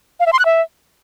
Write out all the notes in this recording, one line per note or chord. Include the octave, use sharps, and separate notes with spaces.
F5
E5
C6
F#6
E5